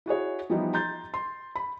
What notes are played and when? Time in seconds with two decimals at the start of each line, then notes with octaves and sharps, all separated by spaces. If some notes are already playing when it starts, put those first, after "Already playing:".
0.06 E4 F#4 G#4 C#5
0.50 E3 F3 G3 B3 D#4 E4
0.74 A#5 C6 G6 A6
1.14 C6
1.56 B5